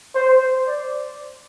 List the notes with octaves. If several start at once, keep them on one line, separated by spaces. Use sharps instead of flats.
C5
D5